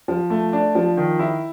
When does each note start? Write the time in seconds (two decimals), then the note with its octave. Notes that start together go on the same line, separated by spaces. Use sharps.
0.08 F3
0.30 A3
0.53 D4
0.75 F3
0.97 D#3
1.19 E4